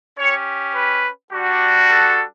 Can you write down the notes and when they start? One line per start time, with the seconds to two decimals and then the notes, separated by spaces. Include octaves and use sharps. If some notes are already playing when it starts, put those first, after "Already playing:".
0.18 C#4 G4 C#5
0.75 B4
1.32 G3 D4 F#4
1.89 A4